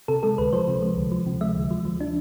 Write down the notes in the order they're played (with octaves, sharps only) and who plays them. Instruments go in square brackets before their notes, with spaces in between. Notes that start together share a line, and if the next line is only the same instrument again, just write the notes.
[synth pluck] C3 A4
G#3 A4
D2 B4
F3 C5
C3
G#3
D2
F3
C3
G#3 E5
D2
F3
F3
D4